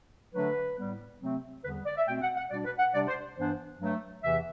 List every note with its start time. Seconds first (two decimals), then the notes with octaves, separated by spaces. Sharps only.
0.34 D3 F#3 A3 D4 B4
0.77 A2 G3 B3
1.21 C3 F#3 A3 C4
1.64 E2 D3 G3 B3 B4
1.85 D5
1.96 E5
2.07 B2 A3 C4 G5
2.21 F#5
2.36 F#5
2.50 B2 G3 D4 D5
2.65 B4
2.79 F#5
2.93 C3 G3 D4 D5
3.08 C5
3.37 G2 E3 B3 D4 C5
3.79 G2 F#3 A3
4.23 E2 C3 E3 E5